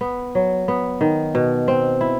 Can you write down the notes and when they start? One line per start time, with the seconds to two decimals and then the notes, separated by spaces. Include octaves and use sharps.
0.01 B3
0.35 F#3
0.68 B3
1.01 D#3
1.35 B2
1.68 C4
2.01 E4